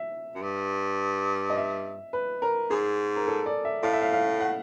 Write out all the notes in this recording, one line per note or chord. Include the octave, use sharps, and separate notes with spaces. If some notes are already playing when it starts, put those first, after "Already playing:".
Already playing: E5
F#2
G2
D#5
E5
B4
A#4
G#2 G#4
A#4
A4
D5
E5
A2 F5
E5
F5
F5
F#5